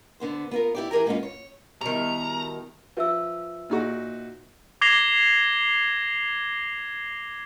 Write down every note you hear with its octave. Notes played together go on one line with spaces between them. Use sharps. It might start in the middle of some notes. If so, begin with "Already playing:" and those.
D3 B3 C5
B3 F4 A#4
E4 G4 D5
E3 G4 G#4 A#4 A#5
G3 G#3 A#3 B3 C#4 F4
C#5
B2 D#3 G3 B3 E4 A#5
F3 B4 E5 E6
A#2 D#4 F#4
D6 G#6 A#6 C7 F7 G7